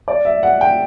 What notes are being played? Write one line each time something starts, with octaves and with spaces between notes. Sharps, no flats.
D5
E5
F#5
G5